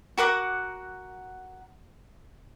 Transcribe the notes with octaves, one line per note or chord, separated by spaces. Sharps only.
F#4 A#4 F#5 D6